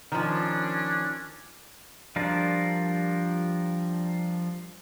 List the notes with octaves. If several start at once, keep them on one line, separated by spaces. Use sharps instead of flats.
D#3 F3 C#4 D4
F3 G3 D4 F4 A#4